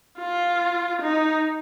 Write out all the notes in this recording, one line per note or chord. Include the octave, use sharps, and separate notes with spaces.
F4
D#4